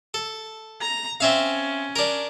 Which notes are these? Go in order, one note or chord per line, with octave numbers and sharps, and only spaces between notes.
A4
A#5
C4 C#4 E5 F5
D4 A#4